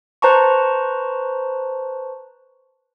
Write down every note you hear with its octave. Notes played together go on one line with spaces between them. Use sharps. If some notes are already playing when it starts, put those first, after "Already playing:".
B4 C5 A5 A#5 C#6